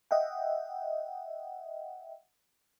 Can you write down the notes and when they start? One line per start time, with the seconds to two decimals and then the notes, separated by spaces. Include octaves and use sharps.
0.11 D#5 E5 F#5 G5